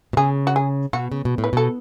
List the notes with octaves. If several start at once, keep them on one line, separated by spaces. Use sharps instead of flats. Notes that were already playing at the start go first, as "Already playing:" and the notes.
B2
C#3 G#4
F#4
G#4
B2 F#4
C#3
B2
A2
B4
B2 A4